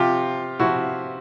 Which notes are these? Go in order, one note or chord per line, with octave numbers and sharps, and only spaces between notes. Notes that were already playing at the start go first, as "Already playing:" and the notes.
Already playing: C3 F3 F4 G4
C3 F3 E4 F#4